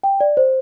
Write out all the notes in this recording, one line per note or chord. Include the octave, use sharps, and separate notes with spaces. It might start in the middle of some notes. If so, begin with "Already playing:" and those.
G5
D5
C5